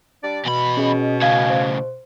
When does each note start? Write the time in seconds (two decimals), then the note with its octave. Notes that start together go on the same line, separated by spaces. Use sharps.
0.24 G3 D4 D5
0.45 E2 B2 B5
0.77 C#4 G#4 D#5
1.21 A2 C#3 F5 G#6
1.50 C5